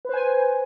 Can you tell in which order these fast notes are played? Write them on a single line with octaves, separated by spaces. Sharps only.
B4 C5 G#5